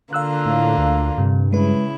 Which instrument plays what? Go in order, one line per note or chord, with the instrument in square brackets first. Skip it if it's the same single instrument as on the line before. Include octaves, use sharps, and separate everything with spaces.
[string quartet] D3 A#3 F4 [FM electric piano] F5 E6 F#6
[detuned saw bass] A2
D2
[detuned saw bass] G2 [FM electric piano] C3
[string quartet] C#3 E4 [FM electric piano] G#3 B4